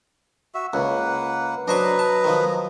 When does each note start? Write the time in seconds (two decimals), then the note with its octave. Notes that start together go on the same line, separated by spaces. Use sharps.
0.55 F#4 E5
0.74 C#2 A#3 B4 F#5
1.68 F#3 D4 B4 C5 D#5 A#5 C#6
1.99 A5
2.24 D#3 F3